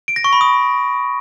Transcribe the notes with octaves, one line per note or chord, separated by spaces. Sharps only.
D7
A#6
C#6
B5
D#6